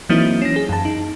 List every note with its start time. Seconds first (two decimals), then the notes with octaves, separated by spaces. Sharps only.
0.09 E3 F#3 A#3 C4 D#4 E4
0.42 C#4 A#6
0.56 G#4
0.69 F#2 A5
0.85 D#4